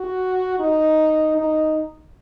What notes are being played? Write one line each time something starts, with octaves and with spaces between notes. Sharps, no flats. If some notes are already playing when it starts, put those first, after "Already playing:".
Already playing: F#4
D#4
D#4